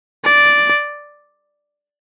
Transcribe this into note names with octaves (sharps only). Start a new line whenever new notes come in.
D5